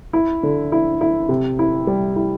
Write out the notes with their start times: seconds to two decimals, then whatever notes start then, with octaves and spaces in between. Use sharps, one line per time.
0.13 E4
0.43 D3
0.72 E4
1.01 E4
1.29 C3
1.59 E4
1.87 G3
2.16 E4